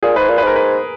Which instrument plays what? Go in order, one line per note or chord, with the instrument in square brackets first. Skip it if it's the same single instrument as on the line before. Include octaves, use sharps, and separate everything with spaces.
[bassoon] A#2 [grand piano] G#4
[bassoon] G#2 [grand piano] B4
[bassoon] A#2
[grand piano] B4
[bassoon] G#2 [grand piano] A#4
[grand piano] B4